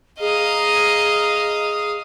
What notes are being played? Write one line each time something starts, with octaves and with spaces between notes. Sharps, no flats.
G#4 D#5 F5 A#5 D#6